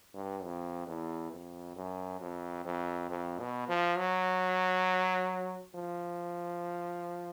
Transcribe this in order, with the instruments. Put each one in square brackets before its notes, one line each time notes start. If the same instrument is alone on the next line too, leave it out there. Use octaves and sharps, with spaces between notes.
[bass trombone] G2
F2
E2
F2
F#2
F2
F2
F2
B2
F3
F#3
F3